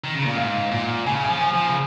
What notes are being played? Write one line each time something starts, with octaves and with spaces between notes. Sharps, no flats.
D#3
C#3
A#2
G#2 F5
A#2
C#3 G#5
G#5
F3
G#5
F3
C#3